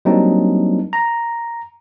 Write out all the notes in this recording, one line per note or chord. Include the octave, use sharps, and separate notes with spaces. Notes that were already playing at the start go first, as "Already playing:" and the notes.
F#3 G3 A#3 C4 D4 D#4
A#5